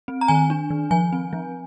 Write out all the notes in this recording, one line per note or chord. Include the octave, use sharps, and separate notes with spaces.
C4
A#5
D#3 G#5
D4
D#3
F3 G#5
C4
F3